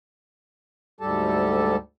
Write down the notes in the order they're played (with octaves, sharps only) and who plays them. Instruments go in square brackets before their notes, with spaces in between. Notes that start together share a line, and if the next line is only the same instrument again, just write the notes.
[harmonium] D2 G#2 G3 G4 A4 A5